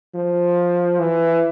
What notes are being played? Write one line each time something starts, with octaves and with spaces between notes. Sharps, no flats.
F3
E3